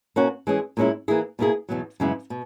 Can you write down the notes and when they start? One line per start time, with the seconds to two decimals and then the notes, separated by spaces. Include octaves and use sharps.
0.16 B2 A#3 C#4 F#4
0.47 E3 G#3 C#4 G#4
0.77 A#2 G#3 C#4 E4
1.08 E3 A#3 E4 G#4
1.39 B2 A#3 E4 G#4
1.69 E2 B2 F#3
2.00 F#2 C#3 G#3 B3 E4
2.30 B2